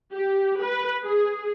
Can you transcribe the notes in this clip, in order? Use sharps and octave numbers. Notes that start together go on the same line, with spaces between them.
G4
B4
G#4